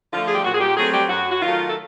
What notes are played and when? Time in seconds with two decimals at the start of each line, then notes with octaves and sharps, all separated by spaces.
0.13 D3 F3 A3 F4
0.26 G#4
0.35 G4
0.44 A#2 F#4
0.55 G#4
0.61 G4
0.77 F#3 A3 C4 G#4
0.94 G4
1.09 F#2 F#4
1.30 F#4
1.41 D#3 F#3 A3 F4
1.69 A4